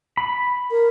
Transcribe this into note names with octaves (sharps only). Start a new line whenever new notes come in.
B5
A#4